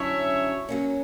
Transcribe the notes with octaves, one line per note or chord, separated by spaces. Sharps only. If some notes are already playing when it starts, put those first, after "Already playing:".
Already playing: F#2 D3 F#3 C#4 E4 C#5 E5
F#3 A#3 C#4